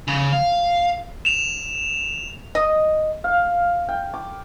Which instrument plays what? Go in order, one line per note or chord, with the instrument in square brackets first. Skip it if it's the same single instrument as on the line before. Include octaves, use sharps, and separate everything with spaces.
[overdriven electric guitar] C#3
F5
[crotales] E7 F7
[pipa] D#5
[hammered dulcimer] F5
G5
D6